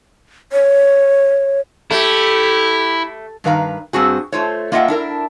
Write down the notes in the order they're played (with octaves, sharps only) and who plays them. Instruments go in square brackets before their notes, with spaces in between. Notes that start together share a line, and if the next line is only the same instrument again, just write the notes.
[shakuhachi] C#5
[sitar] A3 [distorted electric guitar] E4 [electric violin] G4
[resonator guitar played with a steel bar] G2 D#3 B4 F5 A#5
G2 C4 F#4 G#4
A3 F4 C5 C#5
A#3 F4 D#5 E5 F#5 G5
D4 E4 A#4